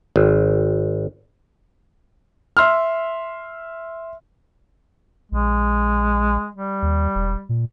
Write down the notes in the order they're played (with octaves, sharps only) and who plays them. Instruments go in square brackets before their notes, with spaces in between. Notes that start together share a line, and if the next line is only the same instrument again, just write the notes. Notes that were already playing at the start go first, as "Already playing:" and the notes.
[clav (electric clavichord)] G#1
[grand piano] E5 C6 E6 F6
[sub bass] A#1 [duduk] G#3
[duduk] G3
[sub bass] D#2
E1
A#2